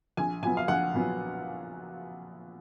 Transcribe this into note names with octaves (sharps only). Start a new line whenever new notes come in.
A#1 G#5
A#2 F#3 B3 G#5
F5
A#1 F#5
A#2 F#3 B3